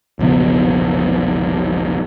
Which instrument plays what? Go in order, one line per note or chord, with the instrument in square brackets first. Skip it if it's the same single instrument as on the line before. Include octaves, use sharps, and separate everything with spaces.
[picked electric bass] E1 A#1 C#3 B3